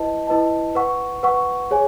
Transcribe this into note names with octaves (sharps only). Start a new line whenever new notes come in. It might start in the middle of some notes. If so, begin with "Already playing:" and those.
Already playing: E4 B4 D#5 A5
E4 B4 D#5 A5
B4 F#5 C#6
B4 F#5 C#6
G#4 C#5 G#5